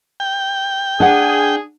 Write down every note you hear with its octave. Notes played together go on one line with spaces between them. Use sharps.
G5
D4 G#4 F#5